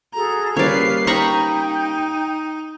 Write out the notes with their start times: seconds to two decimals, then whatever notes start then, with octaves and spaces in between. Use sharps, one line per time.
0.14 F#4 G#4 A4 A#5
0.57 C#3 G3 A#3 B4 C#5 D5 F6 C7
1.07 D#4 G5 A#5 B5 C#6